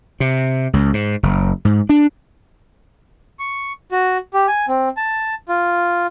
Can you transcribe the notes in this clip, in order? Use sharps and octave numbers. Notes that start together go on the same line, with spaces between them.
C3
C#2
G#2
F#1
G#2
D4
C#6
F#4
G4
G#5
C4
A5
F4